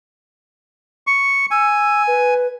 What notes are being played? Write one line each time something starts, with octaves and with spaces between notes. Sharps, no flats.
C#6
G#5 E6
B4